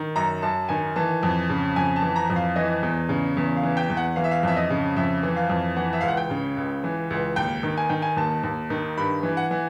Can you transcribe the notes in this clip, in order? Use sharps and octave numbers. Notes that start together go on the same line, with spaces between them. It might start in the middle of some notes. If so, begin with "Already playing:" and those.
Already playing: D#3
F#2 A#5
F#2 A5
D#3 G#5
E3 A5
F2
C#3
F2 G#5
A5
E3
A#5
F2
F5
E3 D#5
E2
C#3
E2
F5
E3
G5
E2
F#5
E3 F5
E5
F5
F2 E5
D#5
C#3
F2 E5
E3
F5
F2
E3 F#5
E5
C#2 F5
F#5
G5
C#3
C#2
E3
C#2
D#2 G5
D#3
G#5
D#3 G5
G#5
D#2 A5
D#2
D#3
G2 B5
E3
F#5
E3